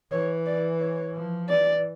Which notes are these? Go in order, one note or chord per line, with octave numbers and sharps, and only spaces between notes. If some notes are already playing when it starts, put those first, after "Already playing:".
E3 C#5
D5
C#5
F3
E3 D5